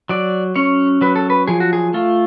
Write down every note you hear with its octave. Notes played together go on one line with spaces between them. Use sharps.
F#3 D5
C#4 C#5
F#3 B4
A4
B4
F3 G#4
F#4
G#4
A3 F4